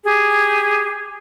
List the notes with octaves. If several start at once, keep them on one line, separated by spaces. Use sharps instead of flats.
G4 G#4